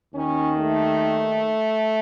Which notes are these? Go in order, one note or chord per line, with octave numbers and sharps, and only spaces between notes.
D#2 D#3 C#4
A3